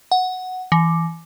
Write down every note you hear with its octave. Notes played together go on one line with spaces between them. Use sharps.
F#5
E3